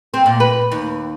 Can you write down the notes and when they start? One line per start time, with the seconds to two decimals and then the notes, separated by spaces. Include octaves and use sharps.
0.14 C4
0.26 A#2
0.40 B4
0.72 D#2